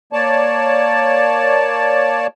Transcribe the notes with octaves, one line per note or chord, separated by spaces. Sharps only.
A#3 C#5 D5 A5